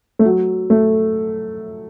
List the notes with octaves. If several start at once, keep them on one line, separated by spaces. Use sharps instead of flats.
A3
F#3
A3